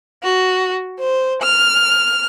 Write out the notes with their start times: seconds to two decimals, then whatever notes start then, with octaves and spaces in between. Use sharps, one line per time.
0.23 F#4
1.00 C5
1.43 F6